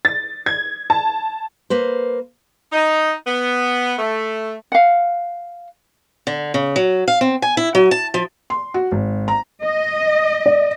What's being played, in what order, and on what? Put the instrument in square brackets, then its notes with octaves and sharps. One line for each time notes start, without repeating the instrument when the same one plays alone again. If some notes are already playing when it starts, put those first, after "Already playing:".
[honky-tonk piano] A6
G#6
A5
[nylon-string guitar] A#3 B4 C5
[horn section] D#4
B3
A3
[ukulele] F5 F#5
[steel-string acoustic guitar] D3
C#3
F#3
F5
C4
G#5
E4
F#3
A5
F3
[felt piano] C6
F#4
G#1
A#5
[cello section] D#5
[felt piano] D5